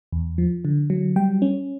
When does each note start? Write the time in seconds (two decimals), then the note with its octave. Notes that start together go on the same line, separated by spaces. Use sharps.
0.13 E2
0.38 F3
0.65 D3
0.90 F#3
1.16 G3 G5
1.42 C#4